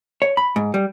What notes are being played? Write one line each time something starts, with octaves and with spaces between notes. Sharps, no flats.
C#5
B5
G#2
G3